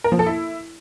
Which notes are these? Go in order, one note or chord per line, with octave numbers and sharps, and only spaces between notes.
A#4
F3
A4
E4